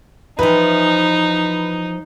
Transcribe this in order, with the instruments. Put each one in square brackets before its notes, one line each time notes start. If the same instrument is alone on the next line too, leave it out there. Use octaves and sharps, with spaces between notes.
[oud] E3 F3 [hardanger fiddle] D#4 [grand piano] B4